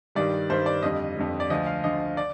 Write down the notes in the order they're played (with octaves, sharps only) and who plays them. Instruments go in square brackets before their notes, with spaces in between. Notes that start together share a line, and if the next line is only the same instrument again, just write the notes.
[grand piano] G2 D#3 G3 D5
G2 D#3 G3 C5
D5
F2 D3 G3 D#5
F2 D3 G3
D5
D2 D3 F3 D#5
F5
D2 D3 F3 D#5
D5